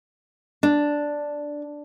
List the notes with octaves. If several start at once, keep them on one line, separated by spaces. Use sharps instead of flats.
D4